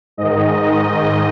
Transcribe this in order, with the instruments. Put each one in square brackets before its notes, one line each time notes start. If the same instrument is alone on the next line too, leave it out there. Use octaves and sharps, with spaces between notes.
[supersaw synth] G#2 D#3 D#5